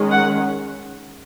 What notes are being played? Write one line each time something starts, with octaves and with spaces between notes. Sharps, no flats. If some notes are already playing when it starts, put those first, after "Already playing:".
Already playing: D#3 G#3 C#4
F#5